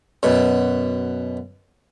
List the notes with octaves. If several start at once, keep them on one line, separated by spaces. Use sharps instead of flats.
F#2 B2